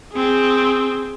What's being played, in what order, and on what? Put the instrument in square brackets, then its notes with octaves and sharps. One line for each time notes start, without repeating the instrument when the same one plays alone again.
[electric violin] C4 G#4